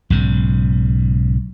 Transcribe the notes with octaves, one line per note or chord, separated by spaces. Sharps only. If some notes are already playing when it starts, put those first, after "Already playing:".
B1 G#2 C#3